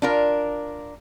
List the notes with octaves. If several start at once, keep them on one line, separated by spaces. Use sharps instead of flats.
D4 F4 A#4